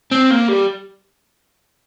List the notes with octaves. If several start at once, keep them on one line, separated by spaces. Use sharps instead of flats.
C4
A#3
G3